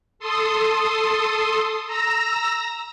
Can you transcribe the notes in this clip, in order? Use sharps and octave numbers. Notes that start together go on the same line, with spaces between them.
A4 C6 D#6
A#5 E6 A#6